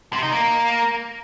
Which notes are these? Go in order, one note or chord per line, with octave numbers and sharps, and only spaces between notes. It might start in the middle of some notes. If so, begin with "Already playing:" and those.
C3
D#4
A#3